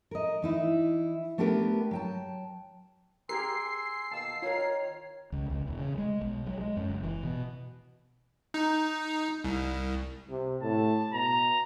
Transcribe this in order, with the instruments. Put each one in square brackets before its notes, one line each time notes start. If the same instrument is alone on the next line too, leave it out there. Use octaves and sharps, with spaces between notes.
[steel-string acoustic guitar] A#4 D#5
E3 D#4 E4
A3 B3 D4 G4 A#4 B4
F#3 G5 A5
[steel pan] G4 G#4 A#4 [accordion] G#5 C6 E6 [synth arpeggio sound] C7
[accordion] B2 D#3 A#3 [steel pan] A5 E6
[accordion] D#3 [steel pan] F4 A#4 [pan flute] C#5
[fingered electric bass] C#2
C#2
E1
C#3
G#3
B1
F#3
G#3
F#2
F#1
E3
B2
[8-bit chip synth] D#4
C2
[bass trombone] C3
[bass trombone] A2 [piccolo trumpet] A5
[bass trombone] B2 [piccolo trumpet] A#5